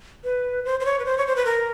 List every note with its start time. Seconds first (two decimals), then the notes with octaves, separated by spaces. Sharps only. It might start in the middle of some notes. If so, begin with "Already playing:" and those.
0.24 B4
0.65 C5
0.80 C5
0.85 C#5
0.99 B4
1.05 C5
1.18 C#5
1.27 C5
1.36 B4
1.45 A#4